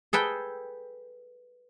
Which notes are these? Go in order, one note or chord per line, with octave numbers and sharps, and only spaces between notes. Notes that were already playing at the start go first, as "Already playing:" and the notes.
G#4 A4 B4 G5